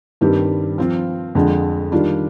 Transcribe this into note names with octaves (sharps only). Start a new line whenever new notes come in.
G2 D#3 G3 C4 G4
F3 C4 F4
F2 D3 G#3
D#3 G3 D4 F4